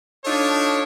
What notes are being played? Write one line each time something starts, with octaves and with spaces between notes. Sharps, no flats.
D4 D#4 F4 A4 C#5